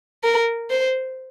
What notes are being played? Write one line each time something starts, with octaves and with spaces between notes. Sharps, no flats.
A#4
C5